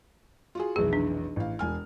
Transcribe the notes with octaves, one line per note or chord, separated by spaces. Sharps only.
F4 F#4 G#4
F1 B1 E3 G#4
D4
A1 F5
E1 G#5 F6